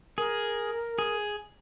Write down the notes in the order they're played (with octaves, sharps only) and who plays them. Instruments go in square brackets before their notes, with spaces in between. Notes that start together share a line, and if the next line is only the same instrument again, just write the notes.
[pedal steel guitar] G#4 [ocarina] A#4
[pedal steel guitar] G#4